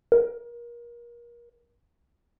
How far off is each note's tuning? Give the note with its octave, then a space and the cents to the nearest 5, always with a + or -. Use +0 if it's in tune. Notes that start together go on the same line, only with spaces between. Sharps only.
A#4 +30